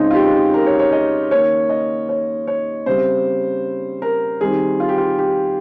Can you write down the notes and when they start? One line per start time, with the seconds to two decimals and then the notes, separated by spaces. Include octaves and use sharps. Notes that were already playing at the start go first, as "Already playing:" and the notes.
Already playing: C#3 G#3 C4 D#4
0.11 F4
0.15 G4
0.54 A#4
0.66 C#5
0.79 C#5
0.92 D#5
1.31 D#3 A#3 C#4 C#5
1.69 D#5
2.09 C#5
2.47 C#5
2.86 C#3 G3 C4 C5
4.02 A#4
4.41 D#3 G3 C4 G#4
4.80 F4
4.89 G4
4.98 F4
5.19 G4